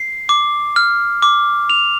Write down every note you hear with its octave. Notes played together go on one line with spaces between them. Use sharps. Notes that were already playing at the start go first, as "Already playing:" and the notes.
Already playing: C7
D6
F6
D6
F7